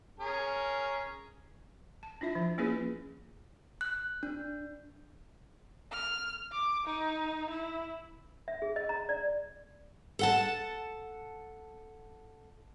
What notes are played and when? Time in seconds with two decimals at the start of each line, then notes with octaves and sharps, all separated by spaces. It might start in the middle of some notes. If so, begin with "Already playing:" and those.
0.19 C#4 G#4 A#4
2.03 A5
2.21 D4 E4 F4 E5
2.35 F3
2.58 A#3 C#4 E4 F4 G#4 B4
3.81 F#6
4.23 D4
5.92 F6
6.52 D6
6.86 D#4
7.50 E4
8.48 E5
8.62 G#4
8.76 D#5
8.89 A#5
9.09 D5
10.19 A4 F#5 A5